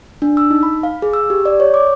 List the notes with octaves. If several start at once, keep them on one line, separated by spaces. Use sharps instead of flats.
D4
E6
D#4
B5
F5
G#4
E6
G4
D5
C#5
D6